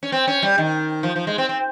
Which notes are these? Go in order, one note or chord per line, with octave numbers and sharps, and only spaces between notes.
C#4
C4
C#4
G3
D#3
F3
F3
G#3
C4
C4